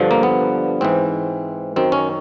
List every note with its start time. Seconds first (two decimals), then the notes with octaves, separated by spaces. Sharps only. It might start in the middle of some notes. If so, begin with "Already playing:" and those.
Already playing: G2 D3 F3
0.11 A#3
0.23 B3
0.81 G#2 E3 C4
1.76 F#2 D#3 C4
1.92 C#4